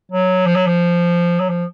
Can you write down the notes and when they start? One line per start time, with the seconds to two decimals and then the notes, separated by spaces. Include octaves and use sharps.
0.12 F#3
0.46 F3
0.55 F#3
0.67 F3
1.40 F#3
1.49 F3